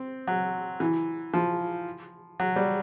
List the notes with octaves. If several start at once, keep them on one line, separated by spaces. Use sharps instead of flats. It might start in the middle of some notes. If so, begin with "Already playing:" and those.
Already playing: C4
F#3
E3
F3
F#3
G3